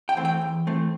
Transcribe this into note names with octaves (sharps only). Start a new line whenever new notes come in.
G5
E3 A3 C4
G5
E2
E3 A3 C4